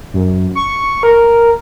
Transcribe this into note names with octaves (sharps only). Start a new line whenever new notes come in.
F#2
C#6
A#4